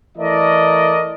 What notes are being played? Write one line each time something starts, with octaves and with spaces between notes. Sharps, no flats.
E3 A3 A#4 D5 D#5